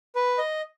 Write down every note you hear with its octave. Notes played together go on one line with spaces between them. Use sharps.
B4
D#5